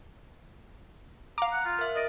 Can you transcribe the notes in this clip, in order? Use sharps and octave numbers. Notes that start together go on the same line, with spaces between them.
F5 A#5 D6
F#5
F4
A#4 E5
A#4 D#5 A6 D7